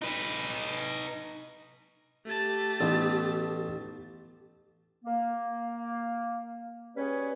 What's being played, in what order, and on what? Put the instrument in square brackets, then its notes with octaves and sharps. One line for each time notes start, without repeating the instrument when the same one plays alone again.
[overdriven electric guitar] D#4 B4
[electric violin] A3 A5 [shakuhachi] G4
[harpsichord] A1 [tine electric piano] B3 D#4 A4
[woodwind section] A#3
G3 C#4 G#4 B4 C#5